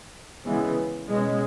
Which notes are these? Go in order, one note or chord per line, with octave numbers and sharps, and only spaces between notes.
C#3 E3 G#3 B3
B2 G#3 C#4